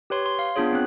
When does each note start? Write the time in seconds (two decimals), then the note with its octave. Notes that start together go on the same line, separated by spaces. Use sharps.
0.10 G4 B4 C#5 C6
0.26 C6
0.39 F5
0.55 B3 D4 F4 G#4 C#5
0.73 C4 F#6